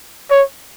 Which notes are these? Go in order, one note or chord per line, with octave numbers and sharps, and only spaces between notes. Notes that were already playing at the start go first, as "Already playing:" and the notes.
C#5